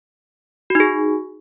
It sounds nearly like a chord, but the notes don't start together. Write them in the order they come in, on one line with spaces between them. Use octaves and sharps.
F#4 D#4 G#4